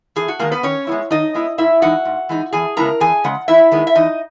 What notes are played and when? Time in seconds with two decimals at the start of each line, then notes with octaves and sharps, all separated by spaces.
0.16 E2 G#4
0.28 F#4
0.39 D#3 G#3 A#3 A#4
0.52 B3 B4
0.63 D#3 C#4 C#5
0.87 G#3 B3 E4
1.11 D#3 D#4 D#5
1.34 G#3 B3 E4
1.58 G#2 E4 E5
1.82 E3 G#3 D#4 F#4 F#5
2.05 G#2
2.29 E3 G#3 D#4
2.53 E2 G#4 G#5
2.77 C#3 G#3 B3 E4 A#4 A#5
3.00 E2 G#4 G#5
3.24 C#3 G#3 F#5
3.48 E2 E4 E5
3.72 D#3 G#3 B3
3.87 E5
3.95 E2 D#4 D#5